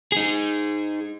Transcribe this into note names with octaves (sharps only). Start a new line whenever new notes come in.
D#4 G#4